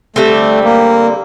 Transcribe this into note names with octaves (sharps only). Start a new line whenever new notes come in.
D3 G3 A3 C4
A#3